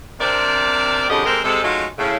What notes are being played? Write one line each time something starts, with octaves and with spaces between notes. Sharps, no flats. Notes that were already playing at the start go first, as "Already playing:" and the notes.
C3 C4 D4 A#4 D5
F2 D3 G#3 C#4 G4 D#5
G#3 C4 G4 A4 A#4 C5
C3 G#3 A4
F#3 G#3 A3 C#4 D#4 F4
A2 C#3